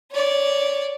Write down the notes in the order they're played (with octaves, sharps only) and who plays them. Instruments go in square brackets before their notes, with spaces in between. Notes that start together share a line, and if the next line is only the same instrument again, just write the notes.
[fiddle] C#5 D5